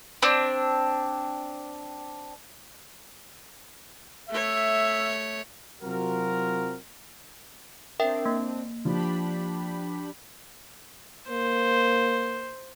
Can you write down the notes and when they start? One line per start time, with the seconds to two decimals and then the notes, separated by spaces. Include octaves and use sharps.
0.23 C4 D4
4.30 A3 C#5 E5
5.82 C3 F#3 C4 F4 F#4 A#4
8.00 C4 D4 A#4 E5 G5
8.26 A#3
8.85 F3 D4 G4 B5
11.29 A#3 C5